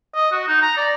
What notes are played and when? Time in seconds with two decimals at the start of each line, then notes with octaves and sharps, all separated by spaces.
0.15 D#5
0.32 F#4
0.48 D#4
0.62 A#5
0.77 D5